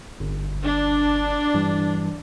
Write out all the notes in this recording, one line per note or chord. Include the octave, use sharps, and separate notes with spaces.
G1
D4
G2 E3 G3